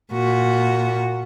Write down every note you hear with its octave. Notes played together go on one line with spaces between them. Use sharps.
A#2 F#4